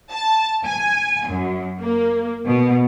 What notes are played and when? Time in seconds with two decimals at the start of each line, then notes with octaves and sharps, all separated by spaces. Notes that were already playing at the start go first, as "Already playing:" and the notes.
0.12 A5
0.66 G#5
1.29 F#2
1.81 A#3
2.47 B2